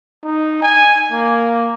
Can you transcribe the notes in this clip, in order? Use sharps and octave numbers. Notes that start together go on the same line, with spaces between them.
D#4
G#5
A#3